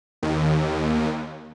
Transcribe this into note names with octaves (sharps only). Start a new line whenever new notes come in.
D#2